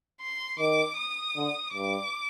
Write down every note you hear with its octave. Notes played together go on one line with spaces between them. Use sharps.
C6
D#3 D6
D#6
D3
G2 D6